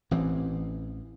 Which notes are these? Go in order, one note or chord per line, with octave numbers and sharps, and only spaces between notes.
A1 E3 C4